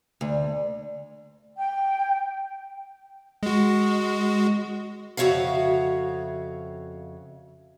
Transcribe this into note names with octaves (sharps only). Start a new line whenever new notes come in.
D2
G5
G#3 F#4
F2 C#3 F#4 C#5 E5 F5